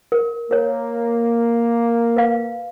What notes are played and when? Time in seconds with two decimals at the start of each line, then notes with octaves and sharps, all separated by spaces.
0.12 A#4
0.51 A#3 A#4 C#5
2.16 B4 F5